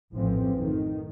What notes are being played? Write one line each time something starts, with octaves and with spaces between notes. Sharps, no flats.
A#1 F#2 A2 E3 F3 C4
A2 D#3